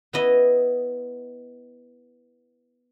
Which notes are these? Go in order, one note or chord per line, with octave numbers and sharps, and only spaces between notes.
B3 E4 D#5